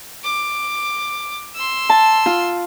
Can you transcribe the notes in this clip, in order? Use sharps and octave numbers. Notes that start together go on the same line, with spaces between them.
D6
C6 E6
A5
F4